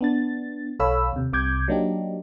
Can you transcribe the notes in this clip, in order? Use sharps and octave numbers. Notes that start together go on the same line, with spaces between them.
B3 D4 A6
B1 A4 C#5 F5 B5 E6
D#2 C3
C2 C3 D6 G6 G#6
F#3 A#3 D4 D#4 G4